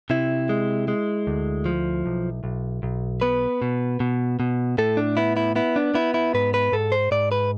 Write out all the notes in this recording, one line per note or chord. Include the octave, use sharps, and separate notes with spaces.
C3 E4
G#3
G#3
D2
F3
B1
B1
B1
B3 B4
B2
B2
B2
A2 A4
D4
B3 E4
E4
B3 E4
D4
B3 E4
E4
G#2 B4
B4
G#2 A4
C5
G#2 D5
B4